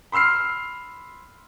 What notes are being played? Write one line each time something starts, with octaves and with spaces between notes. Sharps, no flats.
B5 C6 E6 F6 C7